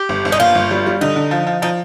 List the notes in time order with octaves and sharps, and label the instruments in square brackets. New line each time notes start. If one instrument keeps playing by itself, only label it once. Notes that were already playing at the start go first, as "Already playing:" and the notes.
Already playing: [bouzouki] G4
[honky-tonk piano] G1
G1
[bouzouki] D#4
[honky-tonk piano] A#3 [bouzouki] F4
[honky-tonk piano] G1
G3
G3
[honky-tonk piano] D3 [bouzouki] D#4
[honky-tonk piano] D3
F3
F3
[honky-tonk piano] F3 [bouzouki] D#4